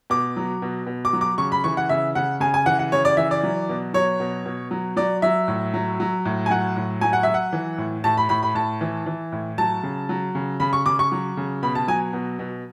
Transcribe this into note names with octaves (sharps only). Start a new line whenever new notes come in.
B2 D6
F#3
B2
B2
D6
F#3
D6
C#3 C#6
B5
E3 C#6
F#5
C#3 E5
C#3 F#5
C#3 G#5
G#5
E3 F#5
F#5
C#3 C#5
D5
E3 E5
D5
F#3
B2
F#3 C#5
B2
B2
F#3
F#3 D5
F#3 E5
A2
F#3
F#3
A2
G#5
F#3 F#5
A2
F#3 G#5
F#5
F#3 E5
F#5
E3
A2
A2 A5
B5
A2 B5
B5
A2 A5
E3
E3
A2
F#3 A5
C#3
F#3
C#3
C#3 B5
C#6
C#3 D6
C#6
F#3
C#3
B2 B5
A5
F#3 G#5
B2
B2